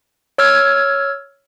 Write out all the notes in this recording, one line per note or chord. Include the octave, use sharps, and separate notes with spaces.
C#5 E6 F6 G#6